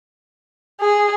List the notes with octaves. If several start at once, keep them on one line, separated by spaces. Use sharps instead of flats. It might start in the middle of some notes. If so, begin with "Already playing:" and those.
G#4